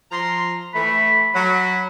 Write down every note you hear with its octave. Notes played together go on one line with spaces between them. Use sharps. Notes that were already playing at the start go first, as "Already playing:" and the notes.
F3 A#5 C6
E3 A3 B5
F#3 B5